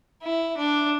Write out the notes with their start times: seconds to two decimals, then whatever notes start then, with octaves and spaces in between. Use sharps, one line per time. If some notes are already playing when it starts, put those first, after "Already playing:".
0.23 E4
0.57 D4